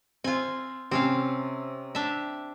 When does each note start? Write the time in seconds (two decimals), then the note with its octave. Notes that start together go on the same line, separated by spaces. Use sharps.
0.24 C4 F4 G#5
0.91 C3 C4 C#4 F5
1.95 D4 G4 E5